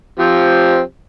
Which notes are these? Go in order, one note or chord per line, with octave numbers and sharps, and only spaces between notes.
F3 C4 G4